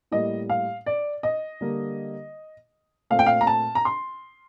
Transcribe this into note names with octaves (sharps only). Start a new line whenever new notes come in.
A2 G3 A#3 D#5
F5
D5
D#5
D3 G3 A#3
A#2 A3 C4 F5
G5
F5
A#5
A5
A#5
C6